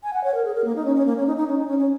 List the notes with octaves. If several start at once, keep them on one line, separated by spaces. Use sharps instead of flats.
G#5
F#5
C#5
A#4
G#4
A#4
A#3
D#4
C#4
C#4
A#3
C#4
D#4
D#4
C#4
D#4
C#4
C#4